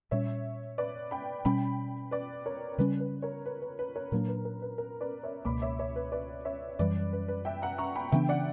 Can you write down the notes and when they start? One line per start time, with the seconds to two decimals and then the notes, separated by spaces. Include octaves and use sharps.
0.11 A#2 G3 C#4 C#5 E5
0.78 B4 D5
1.11 G5 B5
1.45 B2 G3 C#4 G5 B5
2.11 B4 D5
2.46 A#4 C#5
2.78 C#3 G3 C#4 B4
3.00 B4
3.22 A#4 C#5
3.46 B4
3.62 B4
3.79 B4
3.96 A#4 C#5
4.12 A#2 F#3 A#3 D4 A#4
4.28 B4
4.45 A#4
4.62 B4
4.78 A#4
5.01 B4 D5
5.23 C#5 E5
5.45 C#2 B2 A#3 B5 D6
5.62 C#5 E5
5.79 C#5 E5
5.96 B4
6.12 B4 D5
6.45 C#5 E5
6.79 F#2 E3 G3 B4 D5
7.13 B4
7.28 B4
7.45 E5 G5
7.62 F#5 A#5
7.78 A#5 C#6
7.96 G5 B5
8.12 C#3 E3 B3 D4 E5 G5
8.29 D5 F#5